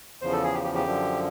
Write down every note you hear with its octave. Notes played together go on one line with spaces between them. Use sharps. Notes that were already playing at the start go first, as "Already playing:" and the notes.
E2 C#3 F3 C5
A4
G#4
G4
G4
G4
F#2 D3 F3